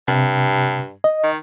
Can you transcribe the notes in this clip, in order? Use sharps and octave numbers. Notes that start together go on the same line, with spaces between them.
G2 C3
D#5
D#3